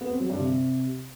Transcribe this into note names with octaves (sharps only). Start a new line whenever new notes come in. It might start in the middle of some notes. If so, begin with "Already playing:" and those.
B3
C4
F#3
G2
C3